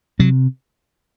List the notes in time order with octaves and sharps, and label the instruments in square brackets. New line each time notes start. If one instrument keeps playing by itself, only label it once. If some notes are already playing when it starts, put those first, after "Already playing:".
[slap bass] C3 F#3